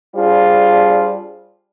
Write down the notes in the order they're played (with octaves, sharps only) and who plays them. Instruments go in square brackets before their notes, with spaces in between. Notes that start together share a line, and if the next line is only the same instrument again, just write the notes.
[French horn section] G3 D4 F4 G#4 C5